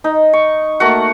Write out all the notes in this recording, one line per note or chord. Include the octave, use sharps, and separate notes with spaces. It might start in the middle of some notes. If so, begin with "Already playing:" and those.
D#4
C#6
A3 A#3 F#4 F#5